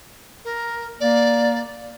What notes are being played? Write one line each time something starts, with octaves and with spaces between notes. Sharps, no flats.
A#4
A#3 D5